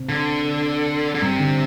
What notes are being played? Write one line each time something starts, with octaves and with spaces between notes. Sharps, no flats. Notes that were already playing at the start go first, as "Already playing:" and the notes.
Already playing: C3 C4
D3
D3
G2 C3 G3
D3